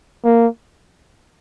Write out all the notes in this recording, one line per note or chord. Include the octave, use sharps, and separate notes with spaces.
A#3